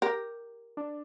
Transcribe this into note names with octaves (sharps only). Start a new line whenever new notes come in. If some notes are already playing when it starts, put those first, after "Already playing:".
G4 A#4
D4